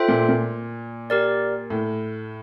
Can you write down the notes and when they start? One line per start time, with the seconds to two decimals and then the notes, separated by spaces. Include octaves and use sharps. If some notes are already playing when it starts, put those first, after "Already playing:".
Already playing: F4 A4 C5 E5 G5
0.08 A#2
0.29 A#2
1.10 G4 A#4 D5
1.70 A2